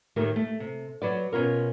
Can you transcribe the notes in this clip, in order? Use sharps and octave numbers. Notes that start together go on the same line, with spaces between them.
D#2 A2 D#3 A3 G4 A#4
A3
C3
F#3 B4 D5
B2 C#4 F4 A#4